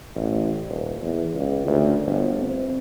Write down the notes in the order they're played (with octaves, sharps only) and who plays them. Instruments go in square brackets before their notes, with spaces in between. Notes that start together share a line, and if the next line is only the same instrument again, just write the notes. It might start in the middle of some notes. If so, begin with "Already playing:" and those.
[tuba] A1
D#1
E2
C#2
D2
G1
C4